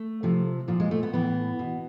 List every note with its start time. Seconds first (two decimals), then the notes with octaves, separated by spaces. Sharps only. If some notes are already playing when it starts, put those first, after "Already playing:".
Already playing: A3
0.23 C3 F3
0.68 A#2 F3
0.80 G#3
0.91 A3
1.03 B3
1.13 A2 E3 B3
1.59 B2